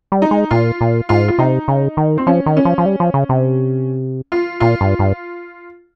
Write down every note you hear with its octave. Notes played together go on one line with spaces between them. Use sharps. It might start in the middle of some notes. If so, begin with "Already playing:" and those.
G3
D#4
G#3
A#2 F4
A#2
G#2 F4
F4
C3 D#4
C#3
D#3
C4
F3 C#4
D#3
C#4
F3
F3
G3
F3
C#3
C3
F4
A#2 F4
G2
G2